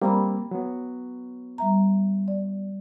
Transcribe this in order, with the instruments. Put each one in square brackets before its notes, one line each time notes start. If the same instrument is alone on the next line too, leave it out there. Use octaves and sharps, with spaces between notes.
[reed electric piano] G3 A#3 C4 [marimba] G5 A#5 B5
[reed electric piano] F#3 B3
[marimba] G3 E5 A#5
D5